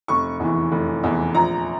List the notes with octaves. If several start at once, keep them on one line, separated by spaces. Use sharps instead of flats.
F1 C#6
E2 E3
F1
E2 E3
A#1 A#5